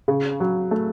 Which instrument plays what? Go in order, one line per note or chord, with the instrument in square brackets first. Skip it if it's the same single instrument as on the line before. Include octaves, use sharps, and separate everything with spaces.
[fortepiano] C#3
F#3
A3